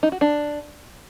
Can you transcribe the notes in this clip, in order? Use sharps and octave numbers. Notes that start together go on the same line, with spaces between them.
D#4
F#4
D4